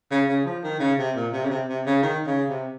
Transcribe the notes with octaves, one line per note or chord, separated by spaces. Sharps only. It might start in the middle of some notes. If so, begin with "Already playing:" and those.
C#3
C#3
F3
D#3
C#3
C3
A#2
C3
C#3
C3
C3
C#3
D#3
C#3
C3